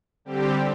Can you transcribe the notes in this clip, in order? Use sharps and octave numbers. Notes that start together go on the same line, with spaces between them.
D3 G3 C4 G4